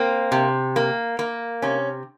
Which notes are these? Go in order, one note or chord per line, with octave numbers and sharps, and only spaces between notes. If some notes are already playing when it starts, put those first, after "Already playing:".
Already playing: A#3 C4
C3
A#3
A#3
C3 C#4